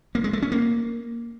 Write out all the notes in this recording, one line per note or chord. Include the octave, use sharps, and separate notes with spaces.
A#3
G#3
A3
C#4
A#3